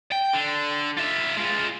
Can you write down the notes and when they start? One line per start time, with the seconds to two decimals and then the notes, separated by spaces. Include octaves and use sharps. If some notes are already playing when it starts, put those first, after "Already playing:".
0.12 G5
0.34 D3
0.98 F4 E5
1.37 G#3 F4